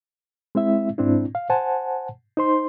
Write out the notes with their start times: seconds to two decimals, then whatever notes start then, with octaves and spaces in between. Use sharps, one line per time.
0.55 G#3 C4 E4 E5
0.98 G#2 C4 D4 E4
1.35 F5
1.50 C5 F#5 G#5 A5
2.37 D#4 C5 C6